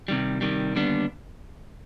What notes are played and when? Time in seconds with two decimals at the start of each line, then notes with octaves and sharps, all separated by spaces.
0.08 C3 D#3 G3
0.41 C3 D#3 G3
0.75 D#2 D3 G3 B3 D4